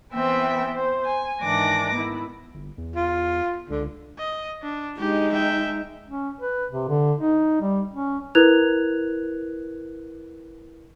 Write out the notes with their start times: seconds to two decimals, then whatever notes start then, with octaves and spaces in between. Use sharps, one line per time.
0.14 E3 B3 C4 C5 E5 G5
0.71 C5
1.05 G#5
1.41 G#2 D#3 E3 D4 D6 A#6
1.94 B3 E4
2.54 G1
2.78 E2
2.96 F4
3.70 C#2 D3
4.18 D#5
4.63 D4
4.99 G#3 D#4 G4
5.33 E5 G5
6.08 C#4
6.41 B4
6.72 C3
6.89 D3
7.21 D#4
7.61 G3
7.91 C#4
8.35 E4 A#4 B4 F#6 G#6 F7